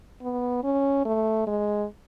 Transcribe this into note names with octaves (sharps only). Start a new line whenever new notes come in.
B3
C#4
A3
G#3